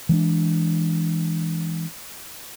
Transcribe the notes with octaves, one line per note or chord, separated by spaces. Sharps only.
E3 G#3 B3 D4